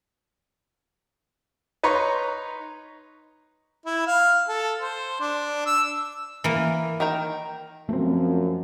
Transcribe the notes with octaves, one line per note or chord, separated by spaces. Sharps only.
D#4 B4 C#5 A#5 C6
E4
F5
A4
C5
D4
E6
E3 A#3
D#3 A#4 G5
F#2 F3 A3 C4